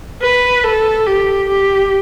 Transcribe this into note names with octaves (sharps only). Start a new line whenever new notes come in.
B4
A4
G4
G4